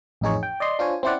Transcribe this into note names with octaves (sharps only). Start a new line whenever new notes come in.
A1 F2 D#4 G#4 C#5
G5
D5 D#5 C6
D4 F4 C5 C#5 G#5
C4 C#4 E4 C5 D5 F#5